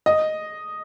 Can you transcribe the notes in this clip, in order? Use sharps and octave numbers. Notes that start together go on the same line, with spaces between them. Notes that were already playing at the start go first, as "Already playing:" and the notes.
D#5